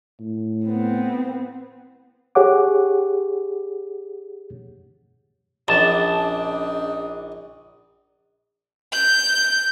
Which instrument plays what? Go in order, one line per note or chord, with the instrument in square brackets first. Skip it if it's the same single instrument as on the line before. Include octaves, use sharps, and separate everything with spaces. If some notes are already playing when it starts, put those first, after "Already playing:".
[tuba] A2
[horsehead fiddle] B3 C4
[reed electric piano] G4 G#4 C#5 F#5 D6
[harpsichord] A#1 [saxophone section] C#3 D4 D#4 [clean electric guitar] A5
[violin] G6